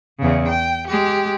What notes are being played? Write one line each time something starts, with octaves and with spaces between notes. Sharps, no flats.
E2 C#3
G5
G#3 G4